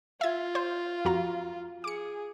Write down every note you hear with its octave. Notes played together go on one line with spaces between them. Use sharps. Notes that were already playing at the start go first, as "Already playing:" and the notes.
F4 E5 G#6
C5
F2 F#4 A#5
G#4 D6 C#7